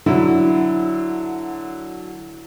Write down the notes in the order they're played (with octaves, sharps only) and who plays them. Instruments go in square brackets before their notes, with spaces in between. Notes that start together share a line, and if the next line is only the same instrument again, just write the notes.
[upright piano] D3 F#3 [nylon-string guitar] E4